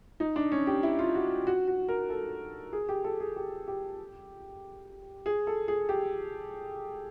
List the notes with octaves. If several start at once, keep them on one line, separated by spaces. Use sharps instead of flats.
D#4
D4
C#4
G4
E4
F4
F#4
F#4
F#4
A#4
A4
G#4
G4
A4
G#4
G4
G4
G#4
A4
G#4
G4